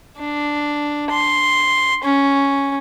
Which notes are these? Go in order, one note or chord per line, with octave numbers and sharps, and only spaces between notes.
D4
C6
C#4